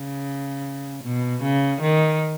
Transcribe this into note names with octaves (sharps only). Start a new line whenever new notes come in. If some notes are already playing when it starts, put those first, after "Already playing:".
Already playing: C#3
B2
C#3
D#3